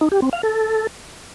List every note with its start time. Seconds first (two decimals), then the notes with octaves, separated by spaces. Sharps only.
0.01 D#4
0.12 G4
0.22 C4
0.33 F5
0.43 A4